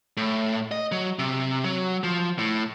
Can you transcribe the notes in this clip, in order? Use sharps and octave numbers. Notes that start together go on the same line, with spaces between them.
A2
D#5
F#3
C3
F#3
F3
A2